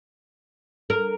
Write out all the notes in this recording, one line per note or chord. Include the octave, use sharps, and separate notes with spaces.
A#4